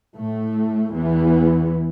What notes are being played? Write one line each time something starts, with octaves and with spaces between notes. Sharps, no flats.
A2 A3
E2 E3 B3